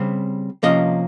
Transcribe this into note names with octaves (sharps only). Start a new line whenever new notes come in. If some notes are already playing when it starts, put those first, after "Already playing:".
Already playing: C#3 G3 C4
C3 F3 A#3 C#4 D#5